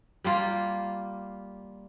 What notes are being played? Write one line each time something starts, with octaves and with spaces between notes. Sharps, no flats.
G3 A#3 F4